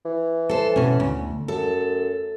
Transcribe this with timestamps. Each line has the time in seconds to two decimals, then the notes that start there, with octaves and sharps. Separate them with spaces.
0.05 E3
0.49 A4 C5
0.76 B2 C#4
1.00 D2
1.48 F#2 A4